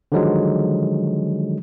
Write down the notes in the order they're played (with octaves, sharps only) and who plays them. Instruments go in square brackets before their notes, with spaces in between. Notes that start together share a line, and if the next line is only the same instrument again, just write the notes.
[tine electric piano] D3 D#3 F3 F#3 G#3